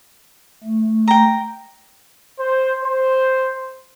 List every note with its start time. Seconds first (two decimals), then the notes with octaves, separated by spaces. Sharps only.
0.64 A3
1.08 G5 A#5
2.40 C5
2.82 C5